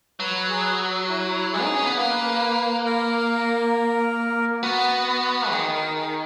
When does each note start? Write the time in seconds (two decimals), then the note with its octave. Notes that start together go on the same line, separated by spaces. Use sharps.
0.20 F#3 B4
0.50 G#4
1.09 E4
1.53 G#4
1.64 D#4
1.75 C#4
1.86 B3
1.97 A#3 B4
2.85 A#4
4.62 B3 F#4
5.51 D#3 G#4
5.73 A#4
5.95 G#4